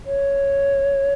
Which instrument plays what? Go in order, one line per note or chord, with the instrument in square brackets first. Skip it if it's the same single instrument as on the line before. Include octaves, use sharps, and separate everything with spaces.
[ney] C#5